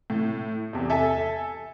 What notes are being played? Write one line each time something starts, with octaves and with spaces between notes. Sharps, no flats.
A2
E2 C3
A4 E5 G#5